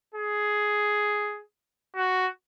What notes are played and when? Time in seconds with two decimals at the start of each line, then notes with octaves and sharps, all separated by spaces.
0.15 G#4
1.96 F#4